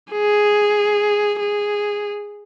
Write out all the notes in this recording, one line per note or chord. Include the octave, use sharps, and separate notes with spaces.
G#4
G#4